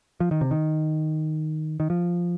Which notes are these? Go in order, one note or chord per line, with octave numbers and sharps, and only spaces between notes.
F3
D#3
C3
D#3
D#3
F3